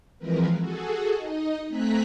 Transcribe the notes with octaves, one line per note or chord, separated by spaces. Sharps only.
E3 F3 G#3 C4 A#4 B4
F#4 G#4 A4
D#4 D#5
A3 C4 G#5 A#5 F#6 B6